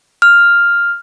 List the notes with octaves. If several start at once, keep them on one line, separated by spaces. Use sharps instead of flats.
F6